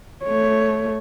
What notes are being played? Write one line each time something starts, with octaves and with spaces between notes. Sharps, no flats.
A3 C#5